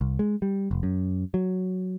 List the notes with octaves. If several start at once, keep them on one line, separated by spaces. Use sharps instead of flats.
C2
G#3
G3
F1
F#2
F#3